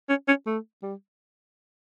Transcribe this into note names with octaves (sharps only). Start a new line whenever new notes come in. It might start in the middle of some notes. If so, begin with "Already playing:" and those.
C#4
C#4
A3
G3